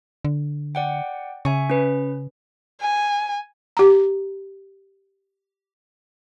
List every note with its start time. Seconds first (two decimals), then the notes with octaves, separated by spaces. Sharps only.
0.25 D3
0.75 D5 F#5 G5
1.45 C#3 E5 G#5 C#6
1.70 C#4 B4
2.81 G#5
3.77 G4 A#5